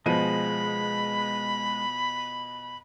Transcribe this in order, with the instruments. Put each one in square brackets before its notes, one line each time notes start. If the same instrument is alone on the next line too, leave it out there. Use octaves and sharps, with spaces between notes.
[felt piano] B2 F3 D#7 [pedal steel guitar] G#3 [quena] B5